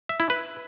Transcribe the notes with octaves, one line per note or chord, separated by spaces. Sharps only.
E5
E4
B4